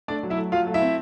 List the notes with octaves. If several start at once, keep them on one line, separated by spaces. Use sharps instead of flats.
A3 D4 D5
F#3
E4 E5
A3
F#3 F4 F5
A3
E4 E5
C4